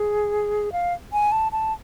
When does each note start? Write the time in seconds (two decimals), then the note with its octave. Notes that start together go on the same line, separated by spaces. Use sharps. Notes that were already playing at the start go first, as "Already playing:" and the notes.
Already playing: G#4
0.72 F5
1.13 G#5
1.32 A5
1.52 A5